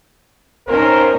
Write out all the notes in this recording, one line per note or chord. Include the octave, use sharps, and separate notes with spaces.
F2 C#4 D#4 A#4 C5